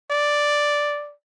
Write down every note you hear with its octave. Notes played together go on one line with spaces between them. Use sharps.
D5